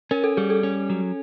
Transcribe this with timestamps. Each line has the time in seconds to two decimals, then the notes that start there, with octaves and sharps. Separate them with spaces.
0.11 C#4 A#4
0.24 A4
0.37 G3 G#4
0.50 A4
0.63 C#4
0.90 F#3